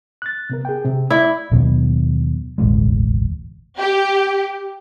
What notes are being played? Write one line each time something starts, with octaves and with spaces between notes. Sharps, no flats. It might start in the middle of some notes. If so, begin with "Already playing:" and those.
F#6 A6
C3 B3 A#4
G#4 G5
C3
E4 D5
D#2 B2 F#3 B3
E1 A1 D2 G#3
G4